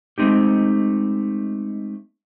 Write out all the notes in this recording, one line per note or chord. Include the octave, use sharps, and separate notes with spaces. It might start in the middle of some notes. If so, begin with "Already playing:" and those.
G#3 A3 C4 D#4 G4